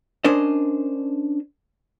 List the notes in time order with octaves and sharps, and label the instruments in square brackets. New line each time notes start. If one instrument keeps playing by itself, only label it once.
[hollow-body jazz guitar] C#4 D4 A#4 C5 D#5